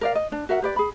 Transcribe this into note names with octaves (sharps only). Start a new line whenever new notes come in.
A#4 D5 F5
D#5
D4
F#4 A#4 E5 F#5
G4 B4 D5
G#4 B5